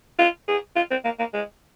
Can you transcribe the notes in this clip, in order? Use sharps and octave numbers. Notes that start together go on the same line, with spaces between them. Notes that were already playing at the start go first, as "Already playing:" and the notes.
F4
G#4
F4
C4
A#3
A#3
G#3